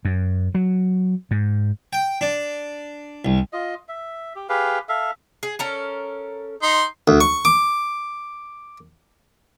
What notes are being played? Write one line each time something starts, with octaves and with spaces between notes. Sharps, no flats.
F#2
F#3
G#2
G5
D4
C2
F4 D#5
E5
G4
G4 G#4 B4 F5
A4 E5 F5
G#4
C#4 A4 A#4
D#4 C6
D2
C#6
D6